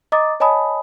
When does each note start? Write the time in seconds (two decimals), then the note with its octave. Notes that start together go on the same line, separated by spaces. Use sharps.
0.12 D#5 A#5 D6 D#6 A6
0.40 C#5 D#5 G#5 A5 B5 D#6